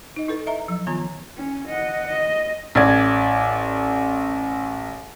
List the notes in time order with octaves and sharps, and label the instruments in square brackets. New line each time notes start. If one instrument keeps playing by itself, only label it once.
[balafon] D#4 D#5
E4 A4 B4
D#5 E5 A#5
F3 F#3
D#3 B3 F4 A#5
[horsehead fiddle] C#4
D#5 F#5
D#5
[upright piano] A1 D5 G#6